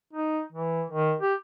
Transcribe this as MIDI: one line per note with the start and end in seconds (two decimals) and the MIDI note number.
0.13 0.41 63
0.53 0.83 52
0.90 1.15 51
1.21 1.34 67